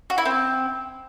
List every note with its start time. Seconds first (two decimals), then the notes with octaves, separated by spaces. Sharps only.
0.10 F#4
0.18 E4
0.25 C4